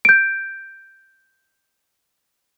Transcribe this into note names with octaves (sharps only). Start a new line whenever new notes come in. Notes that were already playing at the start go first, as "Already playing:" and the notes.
G6 D7